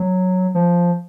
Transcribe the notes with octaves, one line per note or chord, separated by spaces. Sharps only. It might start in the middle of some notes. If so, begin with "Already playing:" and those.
Already playing: F#3
F3